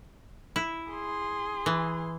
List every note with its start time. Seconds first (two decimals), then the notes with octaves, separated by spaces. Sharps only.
0.56 E4
0.91 G#4 C6
1.66 E3